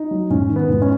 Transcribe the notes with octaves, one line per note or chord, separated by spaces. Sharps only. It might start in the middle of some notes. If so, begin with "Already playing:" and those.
Already playing: D#4
F#3
G#2 C#4
D#3
B3
G#2
C#4